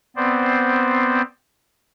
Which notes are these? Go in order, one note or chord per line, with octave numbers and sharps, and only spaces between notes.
B3 C4 C5 D5